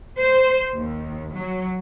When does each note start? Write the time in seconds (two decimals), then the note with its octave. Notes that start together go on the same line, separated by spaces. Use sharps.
0.18 C5
0.73 D#2
1.33 F#3